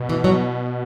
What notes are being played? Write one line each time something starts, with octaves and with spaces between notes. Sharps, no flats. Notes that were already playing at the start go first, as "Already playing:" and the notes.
Already playing: B2
E3
F#3